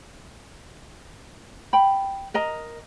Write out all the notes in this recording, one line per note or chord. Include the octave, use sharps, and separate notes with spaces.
G5 B5
A#4 D#5 A#5